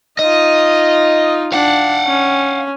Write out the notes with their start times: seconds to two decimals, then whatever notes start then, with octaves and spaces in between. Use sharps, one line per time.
0.19 D#4 F4 D#5
1.53 D4 F5 F#5
2.07 C#4